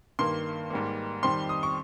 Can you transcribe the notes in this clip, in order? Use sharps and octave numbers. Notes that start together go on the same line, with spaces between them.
G2 D#3 A#3 C6
G#2 G3 A#3
F2 D#3 G3 C4 C6
D#6
C#6